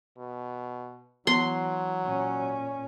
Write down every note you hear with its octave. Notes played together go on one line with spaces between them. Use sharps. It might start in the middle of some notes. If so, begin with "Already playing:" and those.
B2
E3 F#3 B3 C6
A#2 C#4